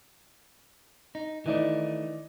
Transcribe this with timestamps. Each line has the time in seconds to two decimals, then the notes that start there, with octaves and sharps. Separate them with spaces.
1.15 D#4
1.46 D#3 E3 A3 D#4 D5